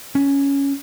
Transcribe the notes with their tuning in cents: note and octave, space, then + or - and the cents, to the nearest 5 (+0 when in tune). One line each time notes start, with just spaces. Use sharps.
C#4 +5